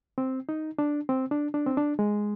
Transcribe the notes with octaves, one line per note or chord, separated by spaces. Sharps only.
C4
D#4
D4
C4
D4
D4
C4
D4
G#3